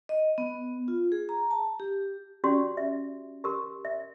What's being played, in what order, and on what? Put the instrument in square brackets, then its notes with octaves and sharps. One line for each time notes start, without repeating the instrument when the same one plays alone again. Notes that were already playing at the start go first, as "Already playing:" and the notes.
[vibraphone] D#5
B3
F4
G#4
A#5
A5
G4
[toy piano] C#4 F#4 G4 D5 C6
E5
G4 A#4 C6
E5